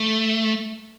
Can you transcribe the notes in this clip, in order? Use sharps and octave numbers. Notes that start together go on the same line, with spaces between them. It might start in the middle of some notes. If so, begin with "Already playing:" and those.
Already playing: A3